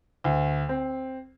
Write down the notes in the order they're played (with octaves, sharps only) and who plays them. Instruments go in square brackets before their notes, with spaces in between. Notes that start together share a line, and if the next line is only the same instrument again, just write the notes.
[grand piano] D2
C4